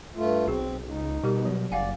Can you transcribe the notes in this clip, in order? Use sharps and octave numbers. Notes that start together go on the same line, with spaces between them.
G2 A3 F4
B1 C4 F#4 G#4
C#2 D#4
B2 G3 G4 A#4
F#3
F#1 D5 F5 F#5 G#5